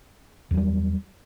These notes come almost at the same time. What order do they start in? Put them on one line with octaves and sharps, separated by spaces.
E2 F#3 G3